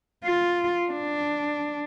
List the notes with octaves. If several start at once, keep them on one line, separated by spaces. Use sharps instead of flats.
F4
D4